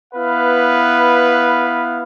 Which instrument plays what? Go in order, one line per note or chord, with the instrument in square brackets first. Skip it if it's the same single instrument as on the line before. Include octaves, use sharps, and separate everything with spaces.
[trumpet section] B3 E4 B4 F5